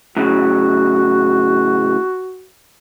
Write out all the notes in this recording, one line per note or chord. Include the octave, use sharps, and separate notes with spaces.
A2 C#3 F#3 F#4